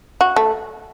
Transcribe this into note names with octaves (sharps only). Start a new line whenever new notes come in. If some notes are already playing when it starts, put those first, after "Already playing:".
F#4
A3